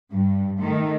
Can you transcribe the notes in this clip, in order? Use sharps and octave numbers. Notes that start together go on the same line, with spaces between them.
G2
D#3 A3